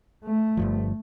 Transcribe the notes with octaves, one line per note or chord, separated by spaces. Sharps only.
A3
G1 G2 F3